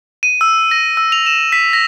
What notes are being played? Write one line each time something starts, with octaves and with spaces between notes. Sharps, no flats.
D#7
E6
A#6
E6
F7
E7
B6
A#6